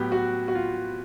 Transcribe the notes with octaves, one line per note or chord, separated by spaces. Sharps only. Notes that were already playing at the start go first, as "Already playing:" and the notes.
Already playing: A2 F#3 B3 G4
F#4
F#4
F4